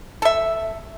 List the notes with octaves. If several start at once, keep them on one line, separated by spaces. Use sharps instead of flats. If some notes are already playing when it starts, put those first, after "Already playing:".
A4 E5